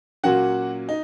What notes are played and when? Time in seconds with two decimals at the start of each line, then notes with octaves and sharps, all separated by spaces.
0.24 A#2 F#3 A#3 C#4 F#4 F#5
0.89 D#4